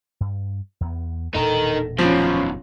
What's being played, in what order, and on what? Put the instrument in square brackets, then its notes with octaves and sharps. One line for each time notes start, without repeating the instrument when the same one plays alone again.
[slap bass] G2
E2 B3
[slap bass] E1 A#2 D4 [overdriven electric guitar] D#4 A#4 [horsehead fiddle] A4
[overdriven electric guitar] F#2 B2 [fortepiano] F3 [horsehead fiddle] C#4 F4